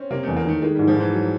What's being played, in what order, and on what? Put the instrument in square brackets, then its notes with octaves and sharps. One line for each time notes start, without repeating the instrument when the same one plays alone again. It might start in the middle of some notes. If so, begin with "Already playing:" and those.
Already playing: [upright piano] C4 C#4
[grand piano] C3 [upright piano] A#3
[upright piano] A3
[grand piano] E2
[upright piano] A#3
[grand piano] D#3 [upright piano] A3
[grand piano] D#3 [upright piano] G#3
[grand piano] G#2 [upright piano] G3
[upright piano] F3
[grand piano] G#2 [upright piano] E3
[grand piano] F#3